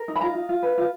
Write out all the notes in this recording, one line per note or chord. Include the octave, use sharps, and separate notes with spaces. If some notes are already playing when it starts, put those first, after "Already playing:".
Already playing: A#4
D#4
B5
F4 A#5
F4
F4
B4
F4